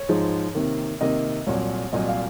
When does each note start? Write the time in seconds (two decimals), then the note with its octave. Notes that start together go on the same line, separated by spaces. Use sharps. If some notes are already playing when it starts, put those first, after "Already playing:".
Already playing: C#5
0.09 G#2 F3 G#3 D#4
0.55 C3 D#3 A#3
1.01 C3 D#3 A#3 D#5
1.46 C2 A#2 F#3 C#5
1.93 C2 A#2 F#3 D#5
2.08 F5